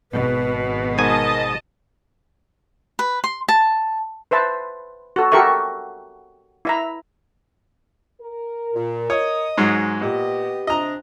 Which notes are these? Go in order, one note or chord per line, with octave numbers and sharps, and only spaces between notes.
G#1 B2 B4
G#2 A#4 D#5 G#5 A5
B4
C6
A5
B4 C5 E5 A5
F#4 A4
F#4 G4 A4 A#4 E5 C#6
E4 E5 A#5
A#4
A#2
C#5 D#5 D#6
G#2 F#3 G#3
A#2 B3 G4 D#5
C3 D4 D#5 A#5